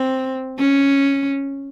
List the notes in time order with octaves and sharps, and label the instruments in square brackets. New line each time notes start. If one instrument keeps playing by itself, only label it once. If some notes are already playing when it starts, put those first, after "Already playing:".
Already playing: [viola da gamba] C4
C#4